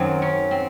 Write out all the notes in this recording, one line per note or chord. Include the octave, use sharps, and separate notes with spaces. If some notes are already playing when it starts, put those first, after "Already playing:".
Already playing: F#2 D#3 F#3 C4
C#4
C4